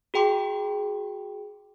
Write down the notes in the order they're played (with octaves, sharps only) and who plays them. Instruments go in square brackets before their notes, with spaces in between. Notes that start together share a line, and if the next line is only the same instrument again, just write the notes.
[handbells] F#4 G#4 G5 C6 D6